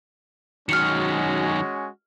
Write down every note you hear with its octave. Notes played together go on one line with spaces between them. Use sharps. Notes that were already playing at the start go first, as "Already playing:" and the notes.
D#3 F#3 G#3 C#4 F#4 F6 C#7